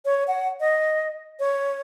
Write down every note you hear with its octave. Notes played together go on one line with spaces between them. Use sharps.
C#5
F#5
D#5
C#5